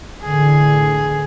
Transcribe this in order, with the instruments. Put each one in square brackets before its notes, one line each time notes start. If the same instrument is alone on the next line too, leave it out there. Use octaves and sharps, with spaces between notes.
[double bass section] A1 D3 E3 [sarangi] G#4